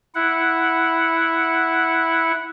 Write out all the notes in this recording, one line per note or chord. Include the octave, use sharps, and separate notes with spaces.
E4 F#5